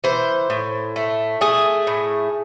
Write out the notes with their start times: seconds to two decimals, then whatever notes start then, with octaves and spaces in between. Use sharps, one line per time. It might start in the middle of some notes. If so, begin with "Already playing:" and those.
0.04 E3 C5
0.50 A2
0.96 A3
1.41 A3 G#4
1.87 A2